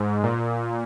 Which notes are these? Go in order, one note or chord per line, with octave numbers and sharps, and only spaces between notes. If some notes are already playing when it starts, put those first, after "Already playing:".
Already playing: G#2
A#2